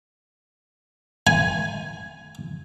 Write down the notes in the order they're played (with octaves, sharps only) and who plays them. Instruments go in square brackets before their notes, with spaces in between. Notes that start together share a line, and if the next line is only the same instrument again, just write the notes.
[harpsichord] G#5